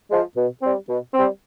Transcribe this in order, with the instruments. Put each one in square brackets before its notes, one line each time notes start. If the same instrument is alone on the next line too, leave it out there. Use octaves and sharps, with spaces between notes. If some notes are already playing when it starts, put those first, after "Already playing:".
[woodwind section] F3 G#3
B2
G3 C4
B2
G3 C4